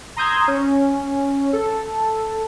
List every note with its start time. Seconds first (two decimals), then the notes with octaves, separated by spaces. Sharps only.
0.17 A#5 C6 D#6 E6 G6 G#6
0.48 C#4
1.53 A4